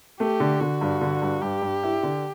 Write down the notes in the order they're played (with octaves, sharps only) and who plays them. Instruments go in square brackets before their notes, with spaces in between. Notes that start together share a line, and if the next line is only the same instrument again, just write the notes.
[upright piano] A3 [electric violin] G4
[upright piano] D3
[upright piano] D3 [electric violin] F#4
[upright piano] G2
D3
G2
[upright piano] G2 [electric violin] G4
[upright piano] G2
E4
D3